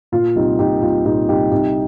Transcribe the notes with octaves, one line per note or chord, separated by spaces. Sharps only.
A#2 F4
C2 D#4 G4
A#2 D#4 G4
C2 F4
A#2 D#4 G4
C2 D#4 G4
C3 D#4 G4